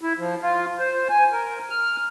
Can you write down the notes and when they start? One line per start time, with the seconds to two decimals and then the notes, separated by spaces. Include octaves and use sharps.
0.01 E4
0.18 F3
0.42 F4
0.79 C5
1.09 G#5
1.32 A#4
1.70 F6